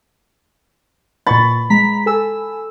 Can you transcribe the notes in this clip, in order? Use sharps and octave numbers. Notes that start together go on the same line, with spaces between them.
A#2 B5 C#6 A6
G#3 A#5 B6
A4 G#5 E6